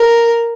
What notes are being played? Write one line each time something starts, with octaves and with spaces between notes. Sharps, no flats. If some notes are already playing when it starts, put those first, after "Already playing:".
Already playing: A#4